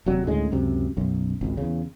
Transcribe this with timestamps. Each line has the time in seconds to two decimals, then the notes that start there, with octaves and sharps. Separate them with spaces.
0.06 D#1 C3 F#3 G3
0.25 D2 A2 C#3 G#3
0.51 C#2 F#2 C3
0.97 B1 F#2
1.41 G#1 C#2
1.57 E2 C#3